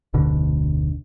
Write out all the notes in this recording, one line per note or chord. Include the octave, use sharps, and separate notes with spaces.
F1 D2 B2 D3